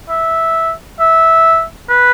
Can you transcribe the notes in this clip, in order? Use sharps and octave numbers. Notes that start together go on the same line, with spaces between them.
E5
E5
B4